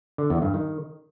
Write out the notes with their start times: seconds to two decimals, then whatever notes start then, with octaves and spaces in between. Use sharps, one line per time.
0.18 D3
0.30 E2
0.42 G2
0.54 D#3